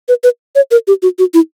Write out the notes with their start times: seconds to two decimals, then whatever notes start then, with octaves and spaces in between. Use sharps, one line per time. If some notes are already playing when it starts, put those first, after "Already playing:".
0.09 B4
0.24 B4
0.55 C#5
0.71 A#4
0.87 G4
1.02 F#4
1.19 F#4
1.34 E4